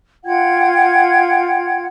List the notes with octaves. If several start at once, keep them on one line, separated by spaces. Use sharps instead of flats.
F4 F#5 G5 G#6